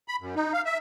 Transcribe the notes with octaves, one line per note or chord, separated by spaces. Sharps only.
B5
F#2
D#4
F5
E5